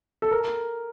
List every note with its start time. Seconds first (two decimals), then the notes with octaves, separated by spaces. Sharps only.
0.22 A4
0.31 A#4